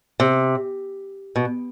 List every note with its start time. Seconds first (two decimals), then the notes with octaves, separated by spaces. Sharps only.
0.20 C3
1.36 B2